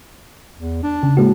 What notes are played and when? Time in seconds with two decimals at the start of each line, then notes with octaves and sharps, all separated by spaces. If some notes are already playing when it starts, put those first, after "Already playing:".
0.57 E2
0.83 D4
1.03 C#3
1.17 A2 G#3 A#3 F#4